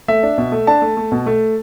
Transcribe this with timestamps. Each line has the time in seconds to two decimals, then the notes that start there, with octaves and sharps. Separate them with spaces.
0.08 A3 E5
0.23 D4
0.38 B2
0.52 A3
0.67 D4 A5
0.82 A3
0.97 A3
1.12 B2
1.26 A3